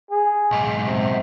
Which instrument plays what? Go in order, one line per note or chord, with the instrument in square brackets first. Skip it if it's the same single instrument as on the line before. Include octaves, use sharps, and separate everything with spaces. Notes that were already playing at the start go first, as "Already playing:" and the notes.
[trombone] G#4
[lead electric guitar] B1 G#2
[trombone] C3